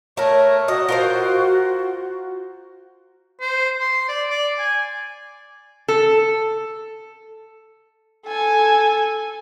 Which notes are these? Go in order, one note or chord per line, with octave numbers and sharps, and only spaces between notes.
A3 A#4 C#5
F#4 D#5
F4 A#4 C5
C5
C6
D5
D5
G#5
A4
A4 G#5